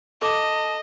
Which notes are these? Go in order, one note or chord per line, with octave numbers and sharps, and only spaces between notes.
A4 D#5 A5 D6